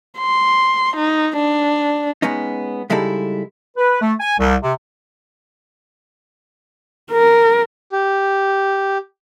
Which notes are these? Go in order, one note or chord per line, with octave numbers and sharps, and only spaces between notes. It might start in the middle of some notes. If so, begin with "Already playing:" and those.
C6
D#4
D4
G#3 B3 C#4 D#4
C#3 G3 G#3 D#4 E4 A4
B4
A3
G#5
C2
C3
A#4
G4